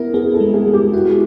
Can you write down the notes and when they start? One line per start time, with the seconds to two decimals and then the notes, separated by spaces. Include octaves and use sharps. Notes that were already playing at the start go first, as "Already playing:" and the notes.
Already playing: B3 E4 A#4
0.14 B3 G#4
0.34 A4
0.40 G#3
0.54 G#4
0.67 G#3
0.73 G4
0.93 E4 F#4